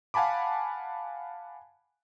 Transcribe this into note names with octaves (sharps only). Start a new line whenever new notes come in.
F5 F#5 G#5 A5 B5 D6